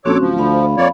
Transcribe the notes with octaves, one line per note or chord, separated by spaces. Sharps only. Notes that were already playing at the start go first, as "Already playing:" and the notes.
A#1 C4 C#4 F#4 A4 C#5 D6
D1 F3
D2 F5 B5
F2 A#3 C#5 D5